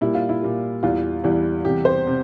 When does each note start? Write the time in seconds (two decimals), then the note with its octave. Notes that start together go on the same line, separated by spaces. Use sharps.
0.01 A#2 G3 E4
0.15 F4
0.29 E4
0.42 A#2 G3
0.83 E2 E3 G3 F4
1.24 E2 E3 G3
1.65 E2 C3 G3 G4
1.85 C5
2.07 C3